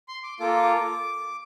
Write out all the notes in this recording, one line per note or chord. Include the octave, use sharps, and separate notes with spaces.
C6
D6
A#3 F4 A4 D6